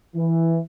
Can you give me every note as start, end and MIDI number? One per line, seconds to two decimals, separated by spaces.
0.16 0.58 52